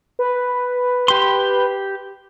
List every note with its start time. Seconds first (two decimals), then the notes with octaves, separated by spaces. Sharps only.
0.19 B4
1.08 G4 C6